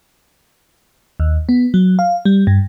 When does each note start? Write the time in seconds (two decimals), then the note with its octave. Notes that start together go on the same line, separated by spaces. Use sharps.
1.20 D#2
1.49 B3
1.74 F#3
1.99 F5
2.25 G3
2.47 G2